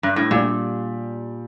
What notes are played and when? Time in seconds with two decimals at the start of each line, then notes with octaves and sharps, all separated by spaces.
0.03 G2
0.16 A2
0.31 A#2 G3 D4 G4